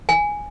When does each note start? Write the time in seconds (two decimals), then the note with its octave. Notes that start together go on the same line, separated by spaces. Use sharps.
0.09 G#5